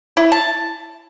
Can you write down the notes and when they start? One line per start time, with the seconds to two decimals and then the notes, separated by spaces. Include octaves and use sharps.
0.17 E4
0.32 A5